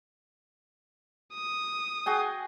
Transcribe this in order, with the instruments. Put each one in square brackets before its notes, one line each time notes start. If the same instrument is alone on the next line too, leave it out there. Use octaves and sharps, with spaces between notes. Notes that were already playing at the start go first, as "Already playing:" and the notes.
[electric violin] D#6
[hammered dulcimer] F#4 G#4 G5